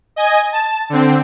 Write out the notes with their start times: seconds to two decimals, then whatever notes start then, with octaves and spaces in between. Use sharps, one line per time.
0.16 D#5 G#5
0.52 A5
0.90 D3 C4